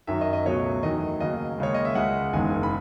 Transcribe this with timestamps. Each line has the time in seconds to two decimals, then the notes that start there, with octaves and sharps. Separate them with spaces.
0.07 F#2 D#3 F#3 E5
0.21 D#5
0.33 D#5
0.45 C#2 B2 F#3 A3 C#5
0.83 E2 D#3 F#3 A3 D#5
1.20 D#2 C#3 F#3 D#5
1.58 D#2 C#3 G#3 C#5
1.74 D#5
1.85 E5
1.95 C#2 C#3 G#3 F#5
2.33 F#1 E2 D#3 G#3 G#5
2.63 B5